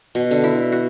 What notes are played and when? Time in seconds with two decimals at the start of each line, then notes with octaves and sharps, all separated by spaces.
0.15 B2
0.31 D3
0.44 E4
0.72 F#4